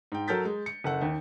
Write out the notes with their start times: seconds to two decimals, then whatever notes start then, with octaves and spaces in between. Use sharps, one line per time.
0.12 G#2 G5
0.27 F#3 A4 A#4 G6 A6 B6
0.45 G#3
0.66 C#7
0.84 F#1 A4 F#5
1.02 D#2